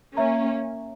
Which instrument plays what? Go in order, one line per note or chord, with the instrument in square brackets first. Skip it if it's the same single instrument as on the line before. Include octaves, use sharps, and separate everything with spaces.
[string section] A#3 C#4 [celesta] C#5 E5 A#5